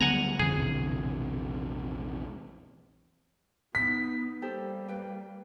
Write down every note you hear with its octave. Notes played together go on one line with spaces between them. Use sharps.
D2 C#3 F#3 G3 B3 F#5 G#5 A#5
F2 B2 D3 E3 G#4
A#1 E2 C3
B3 D#4 B6
G3 A#3 G4 A4 C5
B4 G5